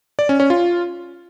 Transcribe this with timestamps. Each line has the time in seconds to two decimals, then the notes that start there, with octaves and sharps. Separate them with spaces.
0.19 D5
0.29 C#4
0.40 C#4
0.50 F4